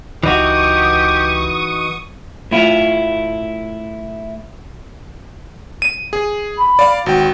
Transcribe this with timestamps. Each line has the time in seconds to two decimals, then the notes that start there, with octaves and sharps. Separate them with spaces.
0.24 C#2 E3 D#4 F#4 G4 C#6 D#6
2.51 A2 E4 F4
5.82 D#7
6.13 G#4
6.58 B5
6.79 D5 F5
7.06 G#1 F#4 G5